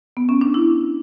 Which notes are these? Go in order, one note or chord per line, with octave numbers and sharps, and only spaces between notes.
B3
C#4
D4
E4